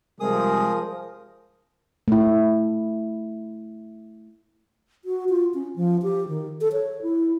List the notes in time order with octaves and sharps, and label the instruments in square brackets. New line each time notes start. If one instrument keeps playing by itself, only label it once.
[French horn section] C3 G3 G#3 [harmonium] F3 [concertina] G#4 D#6 [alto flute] A#4
[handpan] A3 E4
[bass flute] F#4
F4
C#4
F3
G4
D#3
A4
C#5
E4